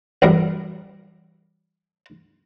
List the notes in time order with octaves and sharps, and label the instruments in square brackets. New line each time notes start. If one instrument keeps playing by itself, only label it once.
[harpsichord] A1 F#2 G3 A#4